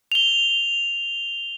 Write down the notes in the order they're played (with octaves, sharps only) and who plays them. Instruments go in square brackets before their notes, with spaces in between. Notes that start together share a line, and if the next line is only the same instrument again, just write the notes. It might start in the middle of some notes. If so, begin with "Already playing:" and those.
[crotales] F7 G7